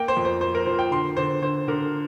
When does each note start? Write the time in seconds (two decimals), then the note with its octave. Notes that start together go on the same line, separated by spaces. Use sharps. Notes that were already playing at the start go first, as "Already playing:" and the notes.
Already playing: A#3 G5
0.08 C5
0.17 F2
0.25 C5
0.41 A#3 C5
0.55 A#4
0.66 F3 C5
0.79 G5
0.91 D3 C6
1.17 D3 C5
1.42 D3 C5
1.68 D3 A#4